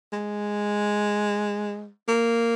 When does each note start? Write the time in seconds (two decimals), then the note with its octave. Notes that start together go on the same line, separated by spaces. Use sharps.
0.13 G#3
2.08 A#3